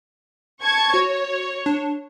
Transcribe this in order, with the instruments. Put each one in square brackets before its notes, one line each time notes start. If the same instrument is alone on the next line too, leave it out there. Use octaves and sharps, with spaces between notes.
[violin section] A5 C#6 G#6
[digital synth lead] F#4 [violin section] C#5
[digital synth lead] D4